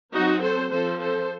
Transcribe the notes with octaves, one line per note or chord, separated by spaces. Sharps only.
F#3 C4 D#4 F#4
A4 C5
F3 C4 A4 C5
A4 C5